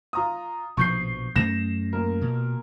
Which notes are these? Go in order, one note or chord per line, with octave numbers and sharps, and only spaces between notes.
F4 A#5 D#6
A#1 B2 F3 C#6 G6 C7
F#2 A3 C#4 A#6 E7
A#2 A#4
B2